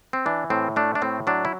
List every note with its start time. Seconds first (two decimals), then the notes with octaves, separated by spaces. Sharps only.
0.13 C4
0.26 E3 D4
0.50 A2 C4
0.76 A3 D4
0.95 D4
1.02 A2 C4
1.27 F#3 D4
1.45 E4